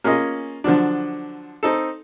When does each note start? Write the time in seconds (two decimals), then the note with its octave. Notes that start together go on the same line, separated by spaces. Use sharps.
0.04 A#3 C#4 F4 G#4 D#5
0.64 D3 F3 F#3 D4
1.63 C4 D#4 A4